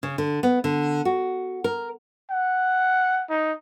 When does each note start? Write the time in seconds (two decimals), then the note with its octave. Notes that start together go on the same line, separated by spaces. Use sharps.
0.03 C#3
0.18 D3
0.43 B3
0.64 D3
1.05 F#4
1.64 A#4
2.30 F#5
3.30 D#4